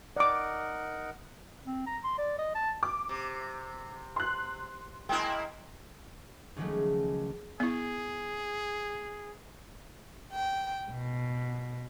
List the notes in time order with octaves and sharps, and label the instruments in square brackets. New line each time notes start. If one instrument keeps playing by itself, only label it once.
[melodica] D#4 A#4 F#5 [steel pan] D5 D6
[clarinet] C4
A#5
C6
D5
D#5
A5
[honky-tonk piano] D6
[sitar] C3
[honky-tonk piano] C6 F#6
[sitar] G#3 A#3 E4 [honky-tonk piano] G5
[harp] C#2 D#3 F3 F#3 G#3 A3
[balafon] B3 E4 [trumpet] G#4
[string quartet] G5
B2